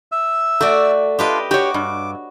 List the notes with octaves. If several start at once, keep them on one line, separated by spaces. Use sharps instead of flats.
E5 E6
A3 F#4 D5
D4 F4 G4 B4 D#5
F#4 G4 C#5 D6
G2